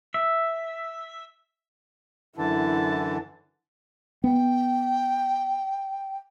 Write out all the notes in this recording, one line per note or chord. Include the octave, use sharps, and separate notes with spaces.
E5
F#2 D3 E3 E4 A5
B3 G5